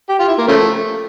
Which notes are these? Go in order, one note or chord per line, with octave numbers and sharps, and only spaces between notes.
G4
F4
E4
A#3
C#3 F3 A3